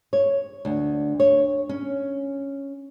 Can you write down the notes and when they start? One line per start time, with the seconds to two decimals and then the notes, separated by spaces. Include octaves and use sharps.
0.13 C#5
0.65 D2
1.20 C#5
1.69 C#4